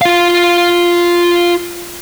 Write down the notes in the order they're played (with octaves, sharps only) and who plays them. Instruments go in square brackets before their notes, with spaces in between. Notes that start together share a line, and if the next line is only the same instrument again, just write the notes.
[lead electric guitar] F4 F5